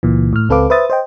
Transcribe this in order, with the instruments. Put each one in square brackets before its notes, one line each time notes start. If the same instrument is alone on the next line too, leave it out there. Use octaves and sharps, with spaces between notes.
[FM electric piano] C#2 A#2 E3
A2 F6
C#2 C4 A4 B4 F5 D6
B4 C5 E5 D#6 A6
C5 D#5 G5